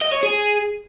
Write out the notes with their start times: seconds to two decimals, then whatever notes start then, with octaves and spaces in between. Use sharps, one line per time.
0.01 D#5
0.12 C#5
0.23 G#4